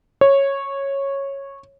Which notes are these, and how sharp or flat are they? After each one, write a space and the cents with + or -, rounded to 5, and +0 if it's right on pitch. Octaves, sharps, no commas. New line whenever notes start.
C#5 -10